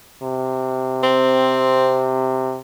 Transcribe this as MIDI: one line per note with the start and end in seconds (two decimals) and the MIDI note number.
0.23 2.59 48
1.03 2.10 60